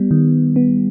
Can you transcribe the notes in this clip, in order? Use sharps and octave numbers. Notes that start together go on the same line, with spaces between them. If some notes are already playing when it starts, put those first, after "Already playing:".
Already playing: G3 B3
D#3
B3